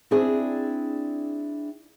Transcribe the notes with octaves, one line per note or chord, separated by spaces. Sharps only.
C4 D4 E4 G#4 D5